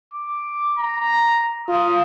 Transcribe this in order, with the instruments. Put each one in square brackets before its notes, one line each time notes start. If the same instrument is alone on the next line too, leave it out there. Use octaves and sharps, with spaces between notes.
[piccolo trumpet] D6
A#5
[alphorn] F4 [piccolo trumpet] D#6